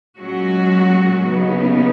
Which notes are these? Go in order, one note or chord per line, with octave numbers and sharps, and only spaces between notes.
A#2 F#3 G#3 C#4 F#4
D#2 C#3 F#3 B3 D#4